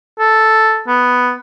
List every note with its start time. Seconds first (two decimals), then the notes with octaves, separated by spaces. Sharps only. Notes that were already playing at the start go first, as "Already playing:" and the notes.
0.19 A4
0.88 B3